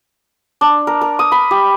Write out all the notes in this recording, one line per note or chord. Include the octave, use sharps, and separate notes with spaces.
D4
A#4
A#4
D#6
B5
G4